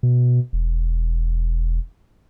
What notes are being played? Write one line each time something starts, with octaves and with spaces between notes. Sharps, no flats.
B2
E1